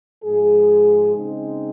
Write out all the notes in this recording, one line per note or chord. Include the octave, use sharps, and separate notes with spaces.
G#2 F3 G#3 G#4
C#3 G#3 C4 D#4